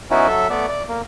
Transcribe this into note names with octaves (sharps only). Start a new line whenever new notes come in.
E3 B3 C#4 D#4 E4 F#4
F#3 A4 E5
A3 B3 D5
D5
A#3